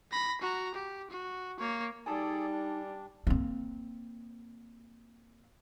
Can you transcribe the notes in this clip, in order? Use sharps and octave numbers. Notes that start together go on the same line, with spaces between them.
B5 A#6
F#4 A#5
G4
F#4
A#3 C#5
G3 D#4 G#4 A4 D5 G#5 A5
D4
A#3 C4